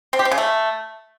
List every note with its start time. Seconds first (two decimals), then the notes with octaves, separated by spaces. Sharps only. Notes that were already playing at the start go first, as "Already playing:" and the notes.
0.13 C4
0.19 G4
0.25 C4
0.31 C#3
0.38 A3